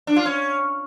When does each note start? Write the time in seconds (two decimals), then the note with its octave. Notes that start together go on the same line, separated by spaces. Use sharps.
0.07 D4
0.16 F4
0.26 C#4